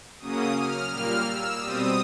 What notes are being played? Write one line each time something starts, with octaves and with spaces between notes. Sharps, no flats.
C#3 F#3 A#3 C#4 D#6
F6
A#2 G3 A#3 F6
E6
B2 G3 C4 D#6